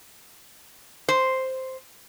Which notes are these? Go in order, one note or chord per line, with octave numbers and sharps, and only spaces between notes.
C5